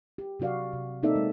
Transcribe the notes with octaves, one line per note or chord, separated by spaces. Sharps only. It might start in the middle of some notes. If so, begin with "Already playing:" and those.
G4
C3 F#3 F#4 D5 F5
C3
A#3 C4 D#4 A4 D5 E5
G#3